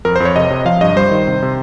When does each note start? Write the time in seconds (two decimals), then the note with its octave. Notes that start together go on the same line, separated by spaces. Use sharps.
0.05 F2 A#4
0.16 C5
0.20 F2
0.25 C#5
0.36 C3 D#5
0.50 C3
0.65 F3 F5
0.81 G2 D#5
0.96 G3 C5
1.11 D#3
1.27 C3
1.42 C3